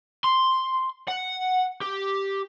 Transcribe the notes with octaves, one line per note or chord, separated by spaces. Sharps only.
C6
F#5
G4